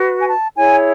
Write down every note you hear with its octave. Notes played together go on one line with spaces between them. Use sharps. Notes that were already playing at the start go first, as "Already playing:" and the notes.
Already playing: F#4 B4
G#5
A5
E4 G#4 C#5 G#5